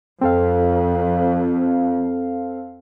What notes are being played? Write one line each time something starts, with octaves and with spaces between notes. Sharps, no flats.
F2 C4 A4 F5